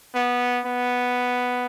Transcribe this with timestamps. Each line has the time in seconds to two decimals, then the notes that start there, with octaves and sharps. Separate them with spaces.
0.15 B3
0.66 B3